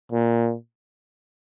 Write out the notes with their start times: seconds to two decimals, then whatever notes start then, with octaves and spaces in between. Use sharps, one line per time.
0.12 A#2